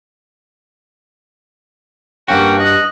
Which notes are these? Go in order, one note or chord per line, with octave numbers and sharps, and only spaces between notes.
G2 A#3 C#4 F#4 G5
D#5 F#6